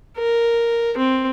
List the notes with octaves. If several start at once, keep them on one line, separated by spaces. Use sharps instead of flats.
A#4
C4